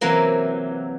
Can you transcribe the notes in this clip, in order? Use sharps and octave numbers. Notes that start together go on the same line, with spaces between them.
C3 E3 F#3 A#3